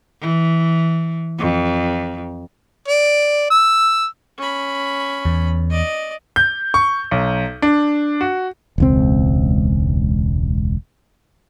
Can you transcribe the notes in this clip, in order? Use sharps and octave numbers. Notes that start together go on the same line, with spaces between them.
E3
F2
D5
E6
C#4 B5
E2
D5 D#5
G6
C#6
B1
D4
F#4
E1 C#2 C4